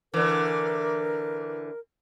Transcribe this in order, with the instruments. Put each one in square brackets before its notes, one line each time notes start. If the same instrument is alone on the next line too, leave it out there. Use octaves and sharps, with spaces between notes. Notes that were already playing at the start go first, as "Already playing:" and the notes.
[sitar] D3 E3 [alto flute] A#4